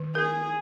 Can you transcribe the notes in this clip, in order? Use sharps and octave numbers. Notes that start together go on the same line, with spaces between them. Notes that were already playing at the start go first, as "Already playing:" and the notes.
Already playing: D#3
G#4 A#4